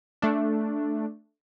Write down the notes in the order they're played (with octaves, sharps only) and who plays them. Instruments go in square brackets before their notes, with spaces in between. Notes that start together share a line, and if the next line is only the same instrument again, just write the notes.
[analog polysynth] A3 D4